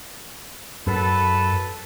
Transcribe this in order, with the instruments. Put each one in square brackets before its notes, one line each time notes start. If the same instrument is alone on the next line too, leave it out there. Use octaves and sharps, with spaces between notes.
[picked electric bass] F#2 [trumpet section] A4 B4